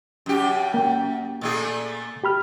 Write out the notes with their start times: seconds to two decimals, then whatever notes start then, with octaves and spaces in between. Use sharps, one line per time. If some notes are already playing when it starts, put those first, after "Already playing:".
0.26 F#2 G4
0.74 A#3 G5
1.41 A#2 A3 G#4
2.24 G4 B5 F6